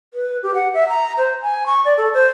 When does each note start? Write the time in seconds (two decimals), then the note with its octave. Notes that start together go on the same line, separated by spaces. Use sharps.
0.14 B4
0.43 G4
0.54 F#5
0.74 E5
0.89 A#5
1.18 C5
1.42 G#5
1.66 C#6
1.85 D5
1.98 A4
2.14 C5